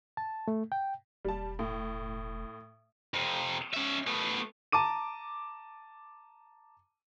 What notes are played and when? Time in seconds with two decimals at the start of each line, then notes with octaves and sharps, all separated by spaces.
0.17 A5
0.48 A3
0.72 G5
1.24 E1 G3 A5
1.59 A2
3.14 F2 C3
3.73 C#4 E5
4.07 A3 B3
4.72 A5 A#5 D6 D#7